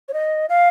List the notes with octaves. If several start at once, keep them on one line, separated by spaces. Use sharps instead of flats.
C#5
D#5
F5